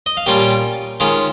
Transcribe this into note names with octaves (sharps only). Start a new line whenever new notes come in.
D#5
F5
A#2 G3 C#4 F4 G4 G5
D#3 G#3 C#4 F4